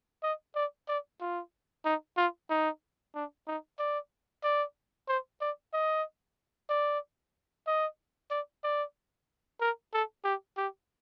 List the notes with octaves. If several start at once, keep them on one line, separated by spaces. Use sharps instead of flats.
D#5
D5
D5
F4
D#4
F4
D#4
D4
D#4
D5
D5
C5
D5
D#5
D5
D#5
D5
D5
A#4
A4
G4
G4